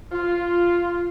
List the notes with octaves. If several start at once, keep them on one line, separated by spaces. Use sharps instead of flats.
F4